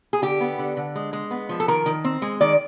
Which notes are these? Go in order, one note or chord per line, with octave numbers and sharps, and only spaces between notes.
G#4
D3 G4
B3
D3
D3
G#3
G#3
B3
F3
A4
D#3 A#4
D#3
C4
G#3
D#3 D5